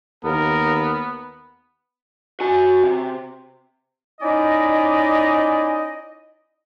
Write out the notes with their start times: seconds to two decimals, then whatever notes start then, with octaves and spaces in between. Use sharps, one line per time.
0.24 D#2 B3 A#4
2.40 F#4 G#5
2.83 C3
4.21 C#4 D#4 E4 D5 D#5